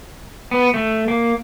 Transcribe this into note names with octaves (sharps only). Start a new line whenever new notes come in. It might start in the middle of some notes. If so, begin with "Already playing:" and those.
B3
A3
A#3